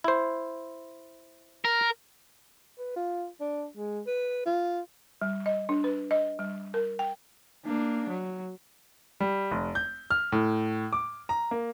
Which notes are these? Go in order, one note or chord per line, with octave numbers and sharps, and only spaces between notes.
E4 C5
A#4
B4
F4
D4
G#3
B4
F4
G3
D#5
D4
B4
D#5
G3
A#4
G5
A#3 D4
F#3
G3
F1
G6
F6
A2
D6
A#5
A#3